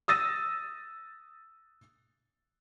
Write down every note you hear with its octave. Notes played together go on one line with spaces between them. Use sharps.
D#6 E6 A6 A#6 D#7